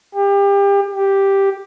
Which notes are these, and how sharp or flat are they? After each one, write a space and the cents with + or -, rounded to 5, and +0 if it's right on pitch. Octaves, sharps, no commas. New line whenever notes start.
G4 +30
G4 +0